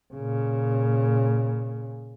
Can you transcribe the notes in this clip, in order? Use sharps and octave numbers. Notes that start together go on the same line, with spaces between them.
A#2 C#3